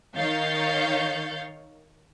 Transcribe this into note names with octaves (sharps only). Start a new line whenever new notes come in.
D#3 C#5 F5 G6 A6 C7